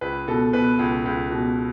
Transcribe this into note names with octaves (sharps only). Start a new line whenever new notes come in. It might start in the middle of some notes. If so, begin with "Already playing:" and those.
C#2 B4
B2 A4
B2 B4
C#2
C#2
B2